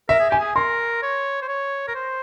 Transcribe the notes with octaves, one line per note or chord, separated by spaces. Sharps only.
A#4 E5
G#4
G4 G#5
G#4
A#4 C6
C#5
C5
C#5
A#4
C5